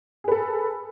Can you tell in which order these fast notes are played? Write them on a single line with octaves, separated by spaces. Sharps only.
G#4 B4 A4